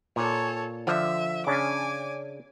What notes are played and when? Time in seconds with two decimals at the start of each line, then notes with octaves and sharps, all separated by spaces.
0.16 A#2 A4 C#5
0.87 D3 F3 E5
1.47 C#3 C#4 D4 G#5 D6